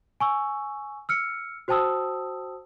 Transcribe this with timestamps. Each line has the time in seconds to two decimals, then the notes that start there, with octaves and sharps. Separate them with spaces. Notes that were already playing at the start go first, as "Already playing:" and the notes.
0.20 G#5 C#6 E6
1.09 E6 F6 C#7
1.68 F#4 C5 G5 A5 D#6 E6